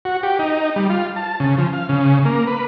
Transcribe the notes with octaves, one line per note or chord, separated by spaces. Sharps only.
F#4
G4
D#4
G3
F4
A5
C#3
F3
F5
C#3
A#3
B4